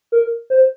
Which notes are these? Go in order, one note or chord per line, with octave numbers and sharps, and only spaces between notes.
A#4
C5